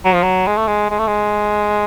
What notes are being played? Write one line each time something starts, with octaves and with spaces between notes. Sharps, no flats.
F#3
F3
F#3
G#3
A3
G#3
G#3
A3
G#3